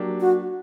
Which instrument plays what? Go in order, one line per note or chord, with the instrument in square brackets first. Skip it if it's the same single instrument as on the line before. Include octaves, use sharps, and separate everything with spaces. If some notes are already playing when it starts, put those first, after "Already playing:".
Already playing: [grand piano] F#3 A#3 D4 G4
[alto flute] F#4